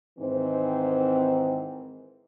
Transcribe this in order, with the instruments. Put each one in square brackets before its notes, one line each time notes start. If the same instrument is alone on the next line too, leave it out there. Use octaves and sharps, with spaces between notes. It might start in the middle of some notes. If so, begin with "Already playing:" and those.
[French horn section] G#2 D#3 E3 C4